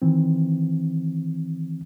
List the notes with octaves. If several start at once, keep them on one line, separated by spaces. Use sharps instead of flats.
D#3 E3 C4